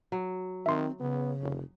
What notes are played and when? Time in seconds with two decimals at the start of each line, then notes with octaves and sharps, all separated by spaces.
0.12 F#3
0.66 D#3 C4 E5 C6
1.00 C#3 B3
1.41 F1